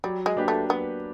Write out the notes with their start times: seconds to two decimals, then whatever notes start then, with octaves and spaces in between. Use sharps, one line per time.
0.04 F#3 G3
0.26 G#3
0.37 A#3 D4 G4 B4
0.48 A3
0.70 F#3 B3